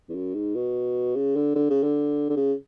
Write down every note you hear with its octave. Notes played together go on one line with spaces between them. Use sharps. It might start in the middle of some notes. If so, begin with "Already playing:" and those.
E2
F#2
G#2
B2
C#3
D3
D3
C#3
D3
D3
C#3